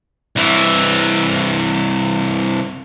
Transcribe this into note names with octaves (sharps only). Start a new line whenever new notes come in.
C2 E3